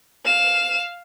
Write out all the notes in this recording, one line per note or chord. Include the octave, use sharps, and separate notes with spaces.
F5 E7